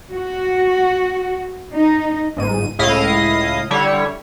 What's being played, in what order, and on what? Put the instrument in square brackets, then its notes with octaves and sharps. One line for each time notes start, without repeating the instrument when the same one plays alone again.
[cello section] F#4
D#4
[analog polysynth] G1 G#2 D#7
C#2 A2 E4 D#5 F5 D#6
D3 G3 E4 C#5